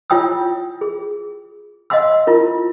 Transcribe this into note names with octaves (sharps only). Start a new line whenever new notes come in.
E4 F4 C#5 G5 D#6 E6
G#4
D#5 F5 F#5 C6 E6
E4 F4 A#4